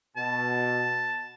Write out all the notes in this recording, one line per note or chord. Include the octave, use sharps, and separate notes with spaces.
B2 A5